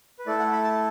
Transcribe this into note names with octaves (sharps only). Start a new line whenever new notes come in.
B4
A3 E4 A4 D5
F#5
B5
A5